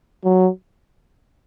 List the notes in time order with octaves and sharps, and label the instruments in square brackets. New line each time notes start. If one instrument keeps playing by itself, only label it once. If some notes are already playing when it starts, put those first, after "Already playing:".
[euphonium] F#3